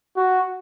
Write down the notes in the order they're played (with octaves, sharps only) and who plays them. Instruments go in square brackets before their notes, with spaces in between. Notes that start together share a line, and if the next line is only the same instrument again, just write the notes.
[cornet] F#4